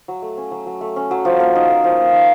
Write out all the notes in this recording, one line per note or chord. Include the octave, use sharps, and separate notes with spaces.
F#3
A3
C#4
F#3
F#3
A3
C#4
F#3
F3
A#3
D#4
A#4
F3
A#3
D#4